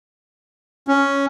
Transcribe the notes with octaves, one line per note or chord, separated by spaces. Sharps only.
C#4